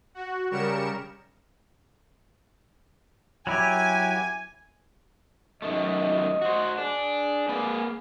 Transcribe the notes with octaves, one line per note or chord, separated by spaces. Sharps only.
F#4
C#3 G3 A#4 C#7 E7
F#3 E4 G4 G#5
F#2 D#3 A3 D#5
F#4 C5
D4 G#4
A#3 B4